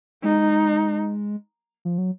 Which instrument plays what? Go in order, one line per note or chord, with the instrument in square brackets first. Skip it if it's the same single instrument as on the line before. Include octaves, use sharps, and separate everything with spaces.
[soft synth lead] G#3 [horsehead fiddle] D#4
[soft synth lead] F3
F#3